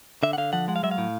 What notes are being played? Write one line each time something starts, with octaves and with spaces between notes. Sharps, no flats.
D3 E5
F#5
D3 F5
F3 F#5
G#3 F#5
F5
F#3 E5
F5
A2